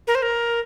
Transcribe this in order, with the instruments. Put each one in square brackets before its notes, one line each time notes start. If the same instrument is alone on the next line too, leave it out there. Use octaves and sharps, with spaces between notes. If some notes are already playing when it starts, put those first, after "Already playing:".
[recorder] A#4
C5
A#4